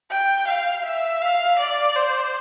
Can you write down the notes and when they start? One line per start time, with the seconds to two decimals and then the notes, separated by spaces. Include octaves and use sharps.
0.11 G5
0.47 F5
0.85 E5
1.21 F5
1.59 D5
1.96 C5